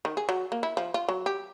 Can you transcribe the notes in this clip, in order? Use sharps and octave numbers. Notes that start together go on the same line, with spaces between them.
D#3
G#4
F#3
A#3
E4
F3
F4
F#3
G4